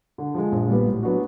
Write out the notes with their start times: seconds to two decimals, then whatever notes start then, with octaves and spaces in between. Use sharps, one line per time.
0.18 D3
0.35 F3 G#3
0.52 A#1
0.68 A#2 G3 B3
0.85 A2
1.03 F#3 B3 D4 F#4